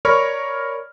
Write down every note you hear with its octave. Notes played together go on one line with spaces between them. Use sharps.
A#4 C#5 D5 B5 C#6 F6